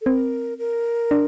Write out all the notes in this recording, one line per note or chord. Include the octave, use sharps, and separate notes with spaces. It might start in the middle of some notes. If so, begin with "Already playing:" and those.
A4
C4 A#4
A#4
D4